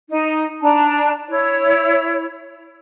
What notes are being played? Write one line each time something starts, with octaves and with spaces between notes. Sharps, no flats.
D#4
D4 A5 A#5
E4 C#5